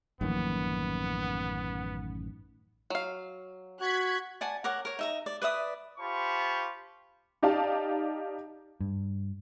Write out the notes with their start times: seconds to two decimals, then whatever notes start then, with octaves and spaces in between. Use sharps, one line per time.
0.21 A1 F#2 D#3 F3 A#3 B3
2.90 F#3 F5
3.81 F#4 F#6 G#6 B6
4.41 D5 F#5 G#5 A5
4.64 A#4 C#5 F#5 D6
4.85 A#4 C#5
4.99 D#4 E5 A#5
5.26 D5
5.42 B4 D5 E5 D#6
5.99 F4 G4 C5 A5 B5 C#6
7.43 D#4 G4 D5 F5 A5
8.80 G2